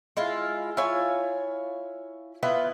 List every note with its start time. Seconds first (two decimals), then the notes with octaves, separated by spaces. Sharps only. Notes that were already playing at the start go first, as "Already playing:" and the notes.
0.17 G#3 E4 F4
0.77 E4 F4 C#5 G#5
2.43 B3 E4 F4 B4